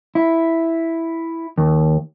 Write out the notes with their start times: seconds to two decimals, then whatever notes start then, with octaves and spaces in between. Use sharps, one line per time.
0.15 E4
1.58 D#2